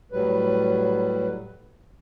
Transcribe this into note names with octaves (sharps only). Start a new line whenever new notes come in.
A2 F#3 G3 B4